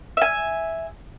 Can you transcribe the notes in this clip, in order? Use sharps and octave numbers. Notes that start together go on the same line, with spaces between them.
E5 G#5